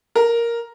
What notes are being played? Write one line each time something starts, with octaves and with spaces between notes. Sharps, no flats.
A#4